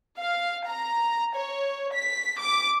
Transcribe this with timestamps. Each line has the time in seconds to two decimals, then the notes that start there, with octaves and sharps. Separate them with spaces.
0.20 F5
0.68 A#5
1.35 C#5
1.94 B6
2.40 D6